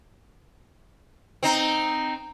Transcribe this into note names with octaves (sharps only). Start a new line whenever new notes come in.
C4 D#4